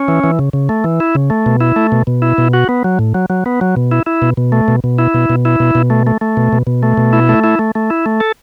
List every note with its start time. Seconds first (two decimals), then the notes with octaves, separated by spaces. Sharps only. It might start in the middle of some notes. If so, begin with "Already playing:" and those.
Already playing: C#4
0.08 E3
0.24 E3
0.39 C#3
0.53 C#3
0.69 A3
0.84 E3
1.00 E4
1.15 C#3
1.30 A3
1.46 B2
1.61 E4
1.76 A3
1.92 B2
2.07 B2
2.22 E4
2.38 B2
2.54 F#4
2.69 B3
2.84 F#3
2.99 A2
3.14 F#3
3.30 F#3
3.46 B3
3.61 F#3
3.76 B2
3.92 E4
4.06 E4
4.22 B2
4.37 B2
4.52 A3
4.68 B2
4.84 B2
4.98 E4
5.14 B2
5.30 B2
5.45 E4
5.60 B2
5.75 B2
5.90 A3
6.07 A3
6.21 A3
6.37 B2
6.53 B2
6.67 B2
6.83 A3
6.97 B2
7.13 E4
7.29 A3
7.44 E4
7.59 A3
7.75 A3
7.90 E4
8.06 A3
8.20 A4